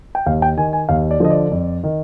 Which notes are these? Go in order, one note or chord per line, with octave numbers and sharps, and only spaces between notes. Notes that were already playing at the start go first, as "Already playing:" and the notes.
G5
D#2 F5
G5
D#3 G#5
G#5
D#2 F5
D5
D3 F3 D#5
D5
F2
D#3